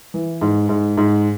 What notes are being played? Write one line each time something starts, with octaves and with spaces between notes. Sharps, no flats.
E3
G#2
G#2
G#2